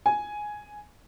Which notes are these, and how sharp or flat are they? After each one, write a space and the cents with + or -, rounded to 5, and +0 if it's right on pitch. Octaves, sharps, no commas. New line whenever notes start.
G#5 +5